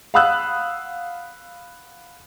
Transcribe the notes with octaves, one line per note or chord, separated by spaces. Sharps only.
F5 F#5 B5 D#6 E6 F#6